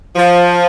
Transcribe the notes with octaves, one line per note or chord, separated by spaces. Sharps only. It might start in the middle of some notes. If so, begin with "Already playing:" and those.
F3